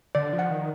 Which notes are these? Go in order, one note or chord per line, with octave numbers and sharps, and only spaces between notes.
D3 D5
F3
F#5
D#3